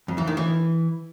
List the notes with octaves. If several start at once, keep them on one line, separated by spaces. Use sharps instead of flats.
F2
E3
D#3
E3